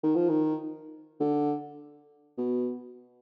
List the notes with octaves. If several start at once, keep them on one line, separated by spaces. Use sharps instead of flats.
D#3
F3
D#3
D3
B2